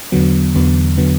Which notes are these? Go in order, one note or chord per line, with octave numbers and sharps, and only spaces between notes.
E2 D3 F#3 B3
E2 D3 F#3 B3
D3 F#3 B3